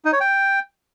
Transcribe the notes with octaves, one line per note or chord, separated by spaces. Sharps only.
D#4
C#5
G5